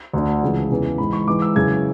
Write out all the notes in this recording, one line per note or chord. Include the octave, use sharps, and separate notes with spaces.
D2 D3
C#2 C#3 E3
E2 C#3 E3
G#2 E3 B5
C#6
G#2 E3 D6
E6
F#2 C#3 E3 G#6